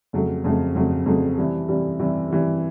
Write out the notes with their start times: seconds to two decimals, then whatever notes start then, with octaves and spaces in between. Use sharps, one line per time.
0.13 F2 C#3 F#3 A3
0.44 F2 C#3 F#3 A3
0.75 F2 C#3 F#3 A3
1.06 F2 C#3 F#3 A3
1.37 C3 E3 G3
1.68 C3 E3 G3
1.99 C3 E3 G3
2.31 C3 E3 G3